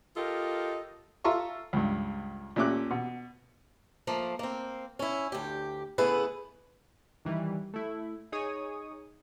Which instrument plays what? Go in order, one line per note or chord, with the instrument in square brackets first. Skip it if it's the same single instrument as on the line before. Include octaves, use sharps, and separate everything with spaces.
[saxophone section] F4 G4 A4 A#4 D#5
[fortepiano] F4 A4 E5 A#5 C6 C#6
C#2 G2
A#2 A3 C#4 G4 D6 F#6
B2
[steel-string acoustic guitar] F3 A3 A#3
A#3 C4
C#4 E4
D2 G4
C#3 A3 B3 E4 G#4 B4
[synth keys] D#3 E3 G3
A3 E4
D#4 G#4 C#5 D#6